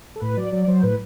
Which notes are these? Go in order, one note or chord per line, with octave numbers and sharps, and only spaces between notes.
A4
A2 B4
F#3 D5
F#3 D5
D5
F#3 C5
A2 B4